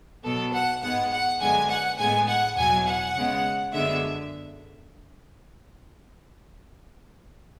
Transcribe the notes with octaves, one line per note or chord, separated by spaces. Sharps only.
B2 F#3 B3 A4
F#5
G#2 G#3 B3 F#5
F#5
F#2 D3 G#3 B3 G#5
F#5
A2 G#3 B3 G#5
F#5
E2 B2 F#3 G#5
F#5
C#3 G#3 B3
F#2 D3 G#3 B3 E5